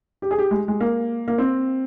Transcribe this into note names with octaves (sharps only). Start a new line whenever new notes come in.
G4
G#4
G4
G#3
G#3
A#3
A#3
C4